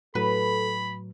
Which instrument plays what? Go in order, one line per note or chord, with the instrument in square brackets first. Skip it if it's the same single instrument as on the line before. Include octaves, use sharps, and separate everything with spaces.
[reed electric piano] A2 F#3 [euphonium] A4 [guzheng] B4 [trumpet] B5